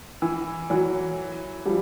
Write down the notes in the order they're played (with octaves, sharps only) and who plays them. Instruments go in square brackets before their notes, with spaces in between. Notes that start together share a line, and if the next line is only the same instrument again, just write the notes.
[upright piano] E3
E3 F#3
F3 G3